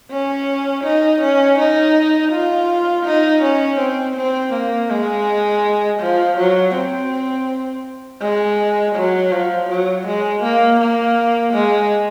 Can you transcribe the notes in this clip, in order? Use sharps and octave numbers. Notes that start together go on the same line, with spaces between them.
C#4
D#4
C#4
D#4
F4
D#4
C#4
C4
C4
A#3
G#3
F3
F#3
C4
G#3
F#3
F3
F#3
G#3
A#3
A#3
G#3